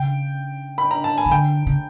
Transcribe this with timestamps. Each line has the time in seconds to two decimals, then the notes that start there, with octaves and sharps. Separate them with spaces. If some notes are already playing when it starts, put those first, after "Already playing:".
Already playing: C#3 G5
0.78 B5
0.91 A#5
1.04 A5
1.18 G#5
1.26 C#3
1.31 D3 G5
1.67 C#3